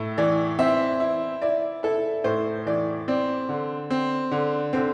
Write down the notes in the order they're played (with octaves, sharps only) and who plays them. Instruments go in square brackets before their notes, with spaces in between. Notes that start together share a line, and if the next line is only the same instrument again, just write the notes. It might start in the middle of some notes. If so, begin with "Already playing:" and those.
Already playing: [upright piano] A2 [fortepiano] E4
[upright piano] E3 [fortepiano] D5
[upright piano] C4 [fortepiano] E5
[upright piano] E4
[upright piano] E4 [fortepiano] D5
[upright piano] E4 [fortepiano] A4
[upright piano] A2 [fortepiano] C5
[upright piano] E3 [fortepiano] D5
[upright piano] C4 [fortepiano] D5
[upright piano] D3
C4
D3
[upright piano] D3 [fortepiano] C4